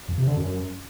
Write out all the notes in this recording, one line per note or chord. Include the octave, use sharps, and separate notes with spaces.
F2
C3
D3
F#2